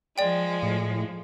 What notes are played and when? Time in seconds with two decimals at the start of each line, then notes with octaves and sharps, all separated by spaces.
0.18 F3 G#3 D5 G5
0.63 A2